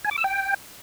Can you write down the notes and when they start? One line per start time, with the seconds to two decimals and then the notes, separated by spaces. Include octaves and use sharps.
0.04 G#5
0.11 D6
0.18 E6
0.24 G5